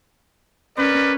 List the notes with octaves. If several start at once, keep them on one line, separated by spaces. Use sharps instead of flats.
C#4 A#4 B4 D5